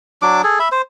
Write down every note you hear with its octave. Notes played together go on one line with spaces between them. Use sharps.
F#3 D4 D6
G#4 A4
E5 B5
C5